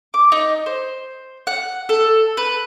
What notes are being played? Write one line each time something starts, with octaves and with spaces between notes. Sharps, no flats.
D6
D#4
C5
F#5
A4
B4